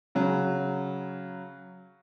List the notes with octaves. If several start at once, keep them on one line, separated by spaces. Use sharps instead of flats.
C#3 F#3